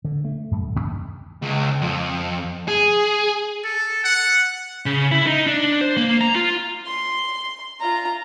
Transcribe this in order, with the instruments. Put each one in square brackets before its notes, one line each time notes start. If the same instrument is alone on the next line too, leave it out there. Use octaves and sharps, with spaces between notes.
[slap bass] D3
A3
F#2
D1
D#2
[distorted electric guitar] C#2
F2
G#4
[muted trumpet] A4
F#5
[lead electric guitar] C#3
E4
D#4
D4
C5
A#3
A#5
F4
[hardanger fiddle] C6
F4 A#5